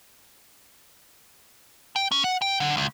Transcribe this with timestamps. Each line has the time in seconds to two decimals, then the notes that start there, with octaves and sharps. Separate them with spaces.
1.96 G5
2.12 C#4
2.24 F#5
2.42 G5
2.60 D3
2.77 C#2